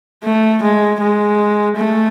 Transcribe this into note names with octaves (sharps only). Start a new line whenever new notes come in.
A3
G#3
G#3
A3